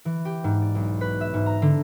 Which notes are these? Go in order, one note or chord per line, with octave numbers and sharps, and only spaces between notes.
E3
G4
G#2
D5
B1
B4
E5
G#2
A#5
D3